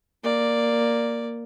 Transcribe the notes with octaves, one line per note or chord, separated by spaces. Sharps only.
A#3 D5